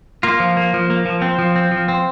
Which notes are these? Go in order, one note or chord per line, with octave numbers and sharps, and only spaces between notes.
A#3 F4
F3
A#3
F3
A#3
F3
C4
F3
C4
F3
C4